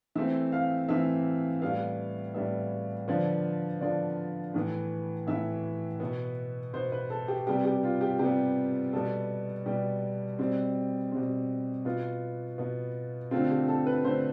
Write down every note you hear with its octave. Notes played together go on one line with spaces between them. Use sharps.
E3 A3 C4 E5
F5
E3 A3 C4 E5
A2 G3 B3 F5
A2 G3 B3 E5
D3 F3 B3 D5
D3 F3 B3 D5
A2 E3 B3
A2 E3 B3 E5
B2 B3
B2 B3 C5
B4
A4
G4
C3 G3 B3 G4
G4
F4
G4
C3 G3 B3 G4
B2 G3 B3 A4
B2 G3 B3 G4
B2 G3 C4
B2 G3 C4
B2 B3 F4
B2 B3
D3 A3 C4 F4
G4
A4
B4
D3 A3 C4 C5